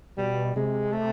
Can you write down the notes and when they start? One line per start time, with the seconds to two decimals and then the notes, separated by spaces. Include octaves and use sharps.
0.18 B2 G3
0.56 C3 G#3
0.93 A3